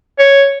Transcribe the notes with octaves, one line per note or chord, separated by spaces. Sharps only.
C#5